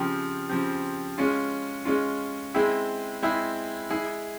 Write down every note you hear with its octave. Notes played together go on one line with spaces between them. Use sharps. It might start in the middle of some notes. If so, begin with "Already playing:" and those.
Already playing: C#3 F3 C4 G4
C#3 F3 C4 G4
G#3 C#4 F4
G#3 C#4 F4
G#3 C4 E4 G#4
G#3 C4 E4 G#4
G#3 E4 G#4